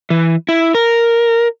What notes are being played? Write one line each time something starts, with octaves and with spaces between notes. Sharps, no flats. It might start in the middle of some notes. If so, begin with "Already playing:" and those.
E3
E4
A#4